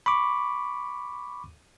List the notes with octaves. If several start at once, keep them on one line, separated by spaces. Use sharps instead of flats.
B5 C#6 D6